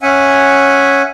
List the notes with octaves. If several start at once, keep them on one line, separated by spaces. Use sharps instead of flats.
C#4 E5 F#5 G#5